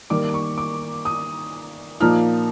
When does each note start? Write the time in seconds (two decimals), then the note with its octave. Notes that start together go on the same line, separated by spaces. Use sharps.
0.10 D#3 G3 A#3 D#4 D6
0.34 C#6
0.58 D6
1.05 D#6
2.00 A#2 F3 A#3 D#4 F6